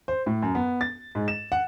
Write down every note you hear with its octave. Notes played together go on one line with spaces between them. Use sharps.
C5
A2
F#2
B3
A6
G#2
E7
F#5